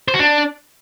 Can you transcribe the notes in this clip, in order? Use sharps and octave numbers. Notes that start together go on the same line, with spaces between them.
C5
F#4
D4